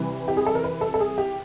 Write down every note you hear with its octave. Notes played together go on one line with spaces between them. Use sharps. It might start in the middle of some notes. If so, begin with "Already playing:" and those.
Already playing: C3 E3 G3 B4
G4
G#4
A4
A#4
B4
A4
A4
G#4
G4